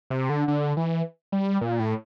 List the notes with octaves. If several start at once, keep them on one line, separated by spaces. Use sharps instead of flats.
C3
D3
D3
E3
G3
A#2
A2